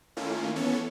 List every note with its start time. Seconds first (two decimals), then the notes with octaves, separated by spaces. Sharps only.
0.16 D#3 A3 A#3 C#4 E4 F4
0.56 E3 B3 C#4 A4 C#5